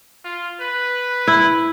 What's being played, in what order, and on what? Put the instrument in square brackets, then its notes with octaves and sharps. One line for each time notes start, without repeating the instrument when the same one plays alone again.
[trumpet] F4
B4
[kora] E4